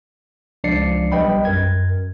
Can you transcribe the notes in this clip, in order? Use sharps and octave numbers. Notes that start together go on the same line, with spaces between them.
C#2 F3 D4 D5 C7 C#7
B1 G3 B4 D#5 G5 B5
F#2 A#4 G#6